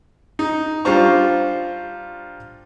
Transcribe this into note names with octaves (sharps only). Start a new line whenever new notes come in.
D#4
G3 D4 F4 C5 A#5 C#6